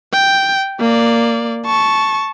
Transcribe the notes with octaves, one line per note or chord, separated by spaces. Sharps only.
G5
A#3 D5
A5 C#6